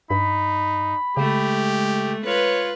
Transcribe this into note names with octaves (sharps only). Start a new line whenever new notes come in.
G2 D#4 B5
C#3 G#3 A3 G4
F4 B4 C#5